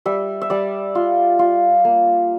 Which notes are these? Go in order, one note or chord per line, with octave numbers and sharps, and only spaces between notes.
G3 E5
E5
G3 D5
F4
F4
A#3